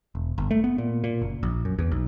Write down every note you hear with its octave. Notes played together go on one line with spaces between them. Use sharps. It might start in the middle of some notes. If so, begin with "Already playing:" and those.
E1
G1
A3
B3
A#2
A#2
F#1
A#1
F#2
E2
B1